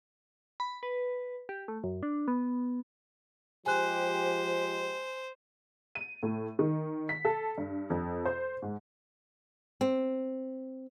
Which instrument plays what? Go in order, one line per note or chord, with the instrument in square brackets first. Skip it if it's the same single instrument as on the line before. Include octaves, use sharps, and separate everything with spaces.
[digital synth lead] B5
B4
G4
A3
F#2
D4
B3
[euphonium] F3 [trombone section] G#3 G4 [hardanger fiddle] C5 [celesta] G#5 F#6
[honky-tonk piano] D#7
A2
D#3
B6
A4
G2
F2
C5
G#2
[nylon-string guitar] C4